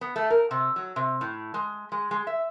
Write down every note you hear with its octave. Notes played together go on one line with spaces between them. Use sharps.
B3
A3
A#4
C3
F#3
C3
A2
G#3
G#3
G#3
E5